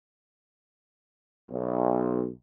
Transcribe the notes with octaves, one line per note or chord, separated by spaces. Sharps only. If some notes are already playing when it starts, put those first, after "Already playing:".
B1